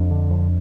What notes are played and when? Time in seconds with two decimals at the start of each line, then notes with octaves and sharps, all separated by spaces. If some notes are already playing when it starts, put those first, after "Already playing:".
Already playing: F2 D4
0.11 D3
0.30 F2